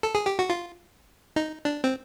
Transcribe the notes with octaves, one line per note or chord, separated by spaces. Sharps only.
A4
G#4
G4
F#4
F4
D#4
D4
C4